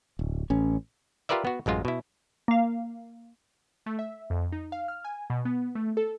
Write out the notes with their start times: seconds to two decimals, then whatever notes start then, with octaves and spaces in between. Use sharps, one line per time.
0.19 D1
0.50 A1 C#4
1.29 F4 G4 A#4 B4 D5 E5
1.45 B3 F#4
1.66 A1 F#2 G#3 F4
1.85 B2 E4
2.48 A#3 F5
3.86 A3
3.99 E5
4.30 F2
4.52 D#4
4.72 F5
4.88 F6
5.04 G#5
5.30 B2
5.45 B3
5.75 A3
5.97 A4